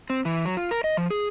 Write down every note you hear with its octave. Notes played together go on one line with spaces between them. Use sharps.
C4
E3
F#3
F4
A#4
D#5
F3
G#4